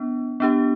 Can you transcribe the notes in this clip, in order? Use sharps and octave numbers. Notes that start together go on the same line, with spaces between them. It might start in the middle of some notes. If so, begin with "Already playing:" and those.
Already playing: B3 D4
B3 D4 G4